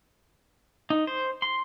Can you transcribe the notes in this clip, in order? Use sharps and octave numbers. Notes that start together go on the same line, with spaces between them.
D#4
C5
C6